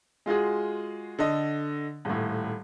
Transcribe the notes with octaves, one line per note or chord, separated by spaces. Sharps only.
G#3 F4 F#4 G#4
D3 A4 D#5
D#1 A2